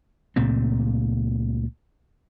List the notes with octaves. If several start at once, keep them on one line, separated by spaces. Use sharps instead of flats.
C#2 A#2 A3 C4